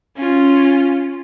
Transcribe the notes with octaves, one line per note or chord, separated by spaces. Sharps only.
C#4 F4